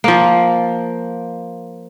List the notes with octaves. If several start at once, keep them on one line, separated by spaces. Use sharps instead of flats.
F3 A#3